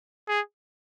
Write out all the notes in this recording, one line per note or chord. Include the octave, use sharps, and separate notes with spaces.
G#4